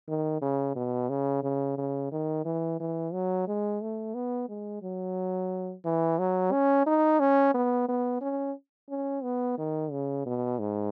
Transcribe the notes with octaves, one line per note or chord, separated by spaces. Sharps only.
D#3
C#3
B2
C#3
C#3
C#3
D#3
E3
E3
F#3
G#3
A3
B3
G#3
F#3
E3
F#3
C#4
D#4
C#4
B3
B3
C#4
C#4
B3
D#3
C#3
B2
G#2